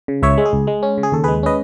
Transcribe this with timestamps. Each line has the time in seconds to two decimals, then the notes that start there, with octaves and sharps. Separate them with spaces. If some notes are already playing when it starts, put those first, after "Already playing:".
0.08 C#3
0.22 C#2 C#5 E5
0.38 G#3
0.46 G#4
0.53 C#2
0.67 G#3
0.83 C#4
0.98 C#3
1.03 G#4
1.12 D#2 A4
1.24 G#3 G#4 B4
1.43 C#4 B4 D#5